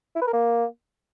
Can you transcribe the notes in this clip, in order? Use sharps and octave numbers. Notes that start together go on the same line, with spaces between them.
E4
B4
A#4
A#3